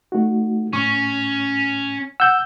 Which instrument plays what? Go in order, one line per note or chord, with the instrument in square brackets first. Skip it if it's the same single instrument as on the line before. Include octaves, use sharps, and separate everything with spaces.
[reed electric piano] A3 D#4 F#4
[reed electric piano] A2 C#6 [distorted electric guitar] C#4
[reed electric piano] F#5 [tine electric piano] E6 G6